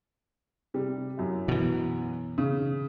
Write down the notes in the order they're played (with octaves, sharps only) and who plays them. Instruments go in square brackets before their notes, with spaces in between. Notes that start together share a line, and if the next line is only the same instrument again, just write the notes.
[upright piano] C3 G3
F#2 E4
[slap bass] B2 E3
[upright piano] C#3